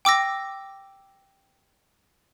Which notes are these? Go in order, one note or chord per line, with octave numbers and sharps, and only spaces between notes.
G5 D6 E6 A#6